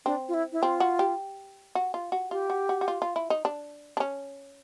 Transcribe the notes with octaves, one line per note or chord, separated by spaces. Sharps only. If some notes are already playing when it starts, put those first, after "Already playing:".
C4 D4
F4
E4
E4
C4 F4
F#4
G4
F#4
F4
F#4
F4 G4
F#4
F#4
F#4
F4
F4
E4
D#4
D4
D4
C#4